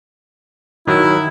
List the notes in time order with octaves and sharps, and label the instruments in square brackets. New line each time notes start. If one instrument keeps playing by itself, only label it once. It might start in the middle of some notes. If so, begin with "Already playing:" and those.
[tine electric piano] D#3 F#3 [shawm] E4